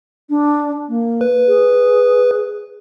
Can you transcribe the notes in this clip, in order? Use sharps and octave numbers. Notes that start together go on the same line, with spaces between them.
D4
A#3
B4
G#4